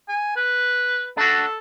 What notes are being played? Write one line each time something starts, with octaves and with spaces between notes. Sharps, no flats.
G#5
B4
D4 F#4 A4